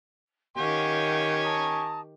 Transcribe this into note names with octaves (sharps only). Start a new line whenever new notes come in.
D#3 G4 F5 F#5 G#5 C#6 G6
A5 A#5 D#6